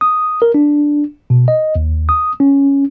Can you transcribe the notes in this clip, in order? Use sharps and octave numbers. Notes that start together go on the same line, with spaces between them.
D#6
A#4
D4
B2
D#5
D#2
D#6
C#4